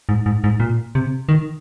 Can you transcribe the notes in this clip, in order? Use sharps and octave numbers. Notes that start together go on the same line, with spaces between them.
G#2
G#2
G#2
A#2
C3
D#3